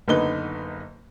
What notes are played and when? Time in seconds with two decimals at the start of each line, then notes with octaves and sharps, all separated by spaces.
0.08 F#1 D3 B3 D#4 B4 G7